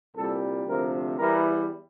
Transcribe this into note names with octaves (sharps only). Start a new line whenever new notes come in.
C2 A#2 G3 A4
D2 C3 F3 A#4
E2 E3 G3 A#4